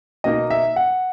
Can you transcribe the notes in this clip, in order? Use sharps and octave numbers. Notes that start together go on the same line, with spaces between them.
B2 A#3 D#4 D#5
E5
F#5